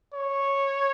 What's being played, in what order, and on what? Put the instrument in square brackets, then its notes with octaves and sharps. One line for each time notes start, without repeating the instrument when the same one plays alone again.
[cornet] C#5